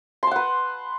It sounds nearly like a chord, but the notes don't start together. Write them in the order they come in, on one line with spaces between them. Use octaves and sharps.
C6 A5 F#5 B4